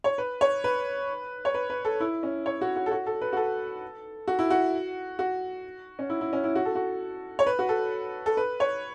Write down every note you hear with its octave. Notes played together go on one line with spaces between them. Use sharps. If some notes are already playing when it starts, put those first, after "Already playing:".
C#5
B4
C#5
B4
C#5
B4
B4
A4
E4
C#4
C#5
F#4
F#4
A4
F#4
A4
B4
F#4
A4
F#4
E4
F#4
F#4
C#4
E4
E4
C#4
E4
F#4
A4
F#4
C#5
B4
F#4
A4
A4
B4
C#5